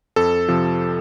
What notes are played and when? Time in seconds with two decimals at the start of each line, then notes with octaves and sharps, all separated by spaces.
0.16 F2 A4
0.48 C3 F3